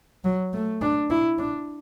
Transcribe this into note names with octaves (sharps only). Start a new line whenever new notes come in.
F#3
A3
D4
E4
D4